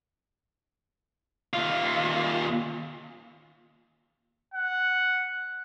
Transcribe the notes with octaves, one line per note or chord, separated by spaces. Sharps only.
D#2 F4
F#5